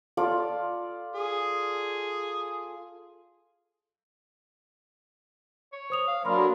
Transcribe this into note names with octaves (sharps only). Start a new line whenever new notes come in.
F4 A4 D5
G#4
C#5
C5 D#6 F7
F5
F#3 A#3 D4 A#4 B5 C6 F6
F#4 A4 A#4